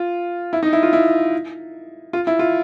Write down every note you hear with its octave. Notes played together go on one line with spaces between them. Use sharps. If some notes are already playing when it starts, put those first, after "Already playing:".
Already playing: F4
E4
D#4
E4
F4
E4
F4
E4
F4